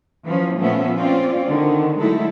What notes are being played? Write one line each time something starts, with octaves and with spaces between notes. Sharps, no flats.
E3 F3 C#4
A#2 F3 A3 B3 C#4 E5
C4 C#4 F4 D5
D3 D#3
F#3 G#3 A3 D#4 E4 A4